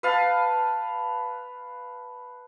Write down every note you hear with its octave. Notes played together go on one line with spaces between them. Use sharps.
B4 F5 A5